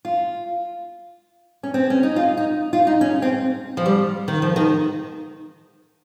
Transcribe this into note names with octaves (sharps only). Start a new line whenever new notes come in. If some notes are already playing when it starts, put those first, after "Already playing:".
F4
C#4
C4
C#4
D#4
F4
D#4
F4
D#4
C#4
C4
F3
G3
D#3
F3
D#3